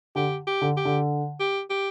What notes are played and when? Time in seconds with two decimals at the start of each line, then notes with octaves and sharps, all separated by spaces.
0.16 D3 G4
0.47 G4
0.62 D3
0.77 G4
0.85 D3
1.40 G4
1.70 G4